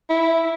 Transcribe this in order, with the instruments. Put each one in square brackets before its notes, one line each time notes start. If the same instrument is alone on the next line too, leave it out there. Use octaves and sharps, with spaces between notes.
[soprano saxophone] E4